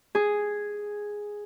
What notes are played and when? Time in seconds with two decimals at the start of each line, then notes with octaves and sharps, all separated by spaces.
0.15 G#4